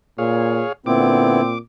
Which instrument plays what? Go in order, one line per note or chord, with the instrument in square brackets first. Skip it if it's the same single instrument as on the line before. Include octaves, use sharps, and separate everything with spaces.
[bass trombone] A#2 [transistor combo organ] G#4 C#5 F5
[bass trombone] A#2 [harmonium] D3 B3 E4 [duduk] C4 [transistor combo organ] D6